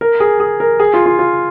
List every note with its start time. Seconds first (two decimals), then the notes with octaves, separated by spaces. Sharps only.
0.01 A#4
0.20 G#4
0.40 G#4
0.60 A#4
0.80 G#4
0.94 F4
1.06 F4
1.19 F4